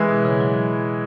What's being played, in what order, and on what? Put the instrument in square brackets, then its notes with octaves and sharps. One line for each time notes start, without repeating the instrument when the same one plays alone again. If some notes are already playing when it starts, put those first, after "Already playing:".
Already playing: [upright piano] E3 G#3 E4 B4
[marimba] B2
C#3
F#3